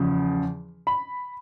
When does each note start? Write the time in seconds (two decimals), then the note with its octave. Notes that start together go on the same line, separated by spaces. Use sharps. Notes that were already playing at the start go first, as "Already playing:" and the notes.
Already playing: E2 C#3 F3
0.87 B5